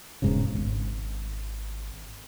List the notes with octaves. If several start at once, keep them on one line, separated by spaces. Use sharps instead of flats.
E1 G#2 C#3
G#1